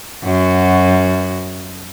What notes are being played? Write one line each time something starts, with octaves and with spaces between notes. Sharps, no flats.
F#2 F#4